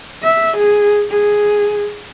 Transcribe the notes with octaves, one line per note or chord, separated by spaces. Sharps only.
E5
G#4
G#4